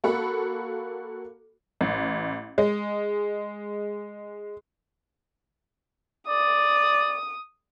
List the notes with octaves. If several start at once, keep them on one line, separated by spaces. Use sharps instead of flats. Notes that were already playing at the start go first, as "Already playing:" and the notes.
A#3 F#4 A4 B5
A1
G#3
D5 D#6